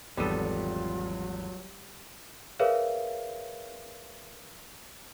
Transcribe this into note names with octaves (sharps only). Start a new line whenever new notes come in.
G#1 E2 F#3 G3 B3 F4 A4 D#7
G#4 A#4 B4 C#5 E5 F5